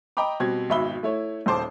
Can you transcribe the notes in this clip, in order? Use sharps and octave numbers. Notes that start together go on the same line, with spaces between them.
D#5 G5 A#5 B5 D6
B2 G3 C4 G#6
G#1 B2 E5 B5 G7
A3 E4 C#5
D#1 D#2 C5 A5 D6